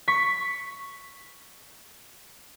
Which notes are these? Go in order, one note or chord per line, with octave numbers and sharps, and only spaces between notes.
C#6 B6